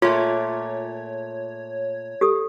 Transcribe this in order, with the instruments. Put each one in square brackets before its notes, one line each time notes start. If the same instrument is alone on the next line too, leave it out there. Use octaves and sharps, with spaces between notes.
[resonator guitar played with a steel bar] A#2 A3 [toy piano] F4 [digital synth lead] C#5
[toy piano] G4 A4 D#6